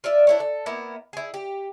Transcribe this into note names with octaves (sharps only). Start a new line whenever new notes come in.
F4 D5 E5
D4 E4 C#5
A4
A#3 B3 E4
E4 G#4
G4